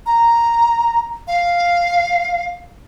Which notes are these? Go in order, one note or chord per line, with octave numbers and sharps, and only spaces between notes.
A#5
F5